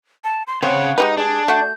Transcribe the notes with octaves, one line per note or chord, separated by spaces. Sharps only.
A5
C6
C#3 C4 C#5 F#5
G#3 D#4 G4 B4
D4 G#4
A3 F#4 G6